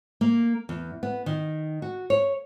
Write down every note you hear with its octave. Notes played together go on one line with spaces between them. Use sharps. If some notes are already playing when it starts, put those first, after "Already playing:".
A#3
E2
B3
D#3
F#4
C#5